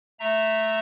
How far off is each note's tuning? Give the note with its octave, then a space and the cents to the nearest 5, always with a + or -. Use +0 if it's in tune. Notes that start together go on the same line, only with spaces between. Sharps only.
A3 -5 E5 +0 A#5 -10